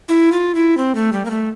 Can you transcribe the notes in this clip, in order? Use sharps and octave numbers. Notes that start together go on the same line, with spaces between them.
E4
F4
E4
C4
A3
G3
A#3
A3